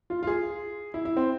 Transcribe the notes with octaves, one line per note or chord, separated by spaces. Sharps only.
F4
F4
G#4
E4
E4
C4